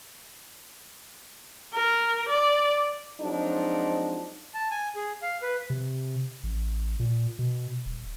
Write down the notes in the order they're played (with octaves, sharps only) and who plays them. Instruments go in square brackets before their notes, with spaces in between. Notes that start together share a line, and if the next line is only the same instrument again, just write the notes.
[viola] A#4
D5
[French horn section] F3 F#3 G#3 C4 D4 D#4
[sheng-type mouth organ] A5
G#5
G#4
F5
B4
[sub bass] C3
A1
A#2
B2
D#1